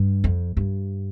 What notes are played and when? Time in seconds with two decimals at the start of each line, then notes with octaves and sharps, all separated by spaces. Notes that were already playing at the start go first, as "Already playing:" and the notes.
Already playing: G2
0.24 F2
0.57 G2